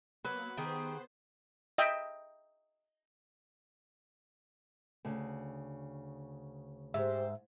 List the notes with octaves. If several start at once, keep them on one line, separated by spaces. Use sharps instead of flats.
F#3 A#3 B3 B4
D#3 B3 G4 G#4 C5
D#5 E5 G5
D2 C#3
G#2 G4 C5 E5